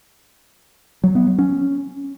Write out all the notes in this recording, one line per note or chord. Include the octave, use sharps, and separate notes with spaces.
F#3
B3
F#3
C#4